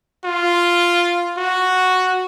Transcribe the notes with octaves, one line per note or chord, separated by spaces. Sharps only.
F4
F#4